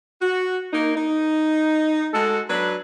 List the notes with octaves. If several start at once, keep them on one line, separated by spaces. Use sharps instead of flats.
F#4
A#3 D#4
D#4
G#3 F#4 A4
F#3 D4 B4